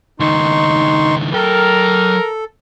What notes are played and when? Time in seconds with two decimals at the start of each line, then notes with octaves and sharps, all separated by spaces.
0.20 C#2 D#3 D#4 C6 C#6
1.34 F#3 A4 A#4 G5